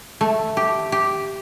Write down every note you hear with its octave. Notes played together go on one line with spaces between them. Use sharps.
A3
G4
G4